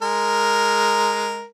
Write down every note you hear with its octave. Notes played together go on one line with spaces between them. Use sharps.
G#3 A#4